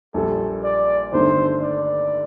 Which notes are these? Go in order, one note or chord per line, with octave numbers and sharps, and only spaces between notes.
A#1 A#2 G3 A4
D5
G1 G2 D#3 A3 D4 C5
D5